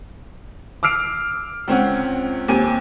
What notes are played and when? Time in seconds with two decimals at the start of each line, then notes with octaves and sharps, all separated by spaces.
0.83 D6 E6 F6 C7 D7
1.68 C#2 C4 C#4 F#5
2.48 D#2 C4 G#5 D#7